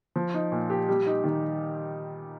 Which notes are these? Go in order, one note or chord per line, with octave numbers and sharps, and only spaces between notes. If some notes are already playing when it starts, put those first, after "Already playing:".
F3
D#4
A#2
G4
G3
D#4
D#3